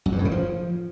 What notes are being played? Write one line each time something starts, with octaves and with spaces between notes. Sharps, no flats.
F#2
G2
A2
C#3
F3